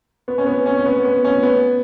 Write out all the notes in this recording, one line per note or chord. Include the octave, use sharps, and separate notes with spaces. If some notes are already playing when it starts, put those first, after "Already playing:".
B3
C#4
B3
C#4
C#4
B3
B3
C#4
B3